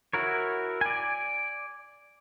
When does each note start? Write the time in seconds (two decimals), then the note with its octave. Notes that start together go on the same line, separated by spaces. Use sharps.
0.13 E4 F#4 A#4 C#5
0.81 D5 G#5